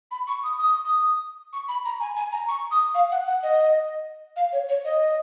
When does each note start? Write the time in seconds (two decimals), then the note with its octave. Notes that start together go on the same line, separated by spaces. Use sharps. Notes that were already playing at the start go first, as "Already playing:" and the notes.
0.11 B5
0.27 C#6
0.43 D#6
0.58 D#6
0.85 D#6
1.53 C#6
1.68 B5
1.85 A#5
2.00 G#5
2.16 G#5
2.32 A#5
2.48 C#6
2.71 D#6
2.94 F5
3.11 F#5
3.26 F#5
3.43 D#5
4.36 F5
4.52 C#5
4.69 C#5
4.85 D#5